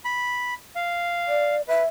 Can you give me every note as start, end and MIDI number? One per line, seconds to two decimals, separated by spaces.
0.05 0.54 83
0.76 1.55 77
1.28 1.62 74
1.68 1.83 71
1.68 1.87 76